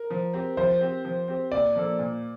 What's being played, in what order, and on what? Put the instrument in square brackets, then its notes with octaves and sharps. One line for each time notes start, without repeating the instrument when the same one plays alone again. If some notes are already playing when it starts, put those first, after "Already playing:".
Already playing: [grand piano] A#4
[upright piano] F3
C4 G4
[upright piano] F3 [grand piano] C5
[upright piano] C4 G4
F3
C4 G4
[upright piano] A#2 [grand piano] D5
[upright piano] F3 A#3 D4 A4
A#2